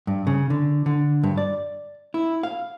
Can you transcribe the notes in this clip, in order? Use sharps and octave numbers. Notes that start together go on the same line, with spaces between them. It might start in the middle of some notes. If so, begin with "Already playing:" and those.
G2
C#3
D3
D3
G2
D5
E4
F5